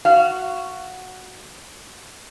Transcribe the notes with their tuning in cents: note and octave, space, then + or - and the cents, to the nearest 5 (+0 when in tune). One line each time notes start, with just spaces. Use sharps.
F#4 +0 F5 -25